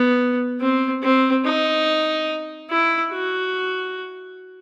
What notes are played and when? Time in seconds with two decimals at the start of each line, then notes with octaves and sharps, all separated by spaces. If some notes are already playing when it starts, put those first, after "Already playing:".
Already playing: B3
0.60 C4
1.02 C4
1.45 D#4
2.70 E4
3.12 F#4